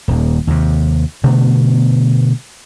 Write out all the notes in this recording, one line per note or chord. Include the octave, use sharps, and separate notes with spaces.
D#1 D#2
D#2 C3
B2 D3 A3 B3